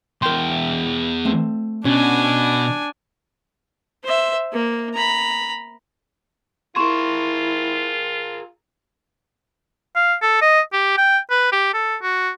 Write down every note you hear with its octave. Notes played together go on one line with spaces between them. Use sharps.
E2 A#4 G5 C6
A3 C4
B2 C#4 D4 G#5
C5 E5
A#3
A#5 B5
E4 F4 G#4 A#4 C6 C#6 E7
F5
A4
D#5
G4
G5
B4
G4
A4
F#4